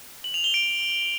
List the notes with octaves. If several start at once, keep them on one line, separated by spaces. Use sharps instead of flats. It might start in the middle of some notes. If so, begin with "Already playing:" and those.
F#7
F7
G7
D7